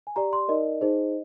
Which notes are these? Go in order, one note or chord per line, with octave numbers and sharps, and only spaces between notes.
G#5
G4 D5 A#5
C6
D#4 A#4 D5 D#5
D#4 G#4 C5